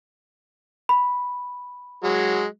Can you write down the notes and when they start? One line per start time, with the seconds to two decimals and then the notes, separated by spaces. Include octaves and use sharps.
0.89 B5
2.04 F#3 G#3